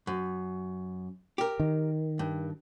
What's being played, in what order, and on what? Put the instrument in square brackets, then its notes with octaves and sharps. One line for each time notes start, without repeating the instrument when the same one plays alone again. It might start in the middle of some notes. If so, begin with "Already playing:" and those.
[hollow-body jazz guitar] F#2
G4 A#4
[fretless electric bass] D#3
[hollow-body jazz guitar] G2